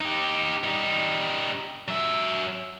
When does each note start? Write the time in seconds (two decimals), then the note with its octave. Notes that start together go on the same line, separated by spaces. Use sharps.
0.01 D#4 G4
0.64 G3 D#4
1.88 F#3 E5